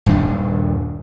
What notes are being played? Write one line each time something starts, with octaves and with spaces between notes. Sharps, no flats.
D#1 G2 D#3 D4